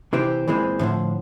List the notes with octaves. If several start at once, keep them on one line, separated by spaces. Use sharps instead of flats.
C3 E3 C4 G4
A#2 E3 G#3 C4
A2 D3 D#3 F3